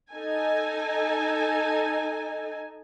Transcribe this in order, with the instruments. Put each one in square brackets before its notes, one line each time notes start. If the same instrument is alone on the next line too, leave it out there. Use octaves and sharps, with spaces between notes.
[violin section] D#4 A4 G#5